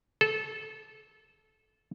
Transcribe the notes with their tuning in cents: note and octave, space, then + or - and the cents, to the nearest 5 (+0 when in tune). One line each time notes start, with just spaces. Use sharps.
A4 -20